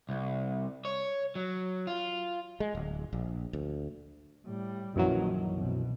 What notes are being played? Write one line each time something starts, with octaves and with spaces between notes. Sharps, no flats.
C2
C#5
F#3
F4
G#3
D1
A#1
D2
A2 G3
A#1 F#2 D#3 E3 F#3
C2 B2